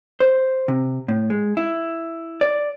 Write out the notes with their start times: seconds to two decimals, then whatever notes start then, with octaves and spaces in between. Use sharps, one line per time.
0.20 C5
0.68 C3
1.08 A2
1.30 G#3
1.57 E4
2.41 D5